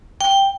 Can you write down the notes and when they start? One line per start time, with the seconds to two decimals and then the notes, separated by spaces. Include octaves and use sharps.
0.21 G5